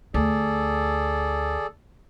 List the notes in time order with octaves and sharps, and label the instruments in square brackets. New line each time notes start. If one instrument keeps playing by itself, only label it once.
[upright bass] D2 [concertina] G#4 A4 D5